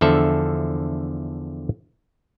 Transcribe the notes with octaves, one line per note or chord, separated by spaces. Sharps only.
E2 D3 F3 A4 E5